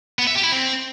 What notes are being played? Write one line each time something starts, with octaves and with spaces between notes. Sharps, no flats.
B3
E5
G4
E4
C4